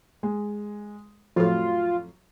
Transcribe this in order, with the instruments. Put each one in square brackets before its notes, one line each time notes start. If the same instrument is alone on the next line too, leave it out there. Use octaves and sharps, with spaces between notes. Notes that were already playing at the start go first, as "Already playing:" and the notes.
[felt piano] G#3
[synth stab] F2 A2 [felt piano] F#3 [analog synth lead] F4